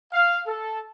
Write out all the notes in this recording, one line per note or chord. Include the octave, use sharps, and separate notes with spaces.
F5
A4